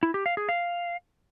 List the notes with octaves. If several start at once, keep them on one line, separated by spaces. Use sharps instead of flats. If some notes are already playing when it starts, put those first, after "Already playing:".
E4
G4
F5
G#4
F5